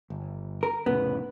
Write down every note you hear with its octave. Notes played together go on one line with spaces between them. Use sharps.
G1
A#4
F1 A2 C#3 B3